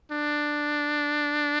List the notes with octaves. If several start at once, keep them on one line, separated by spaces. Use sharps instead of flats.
D4